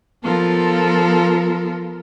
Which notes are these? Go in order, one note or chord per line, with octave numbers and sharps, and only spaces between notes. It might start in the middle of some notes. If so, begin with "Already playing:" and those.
F3 B3 F4 A4 A#4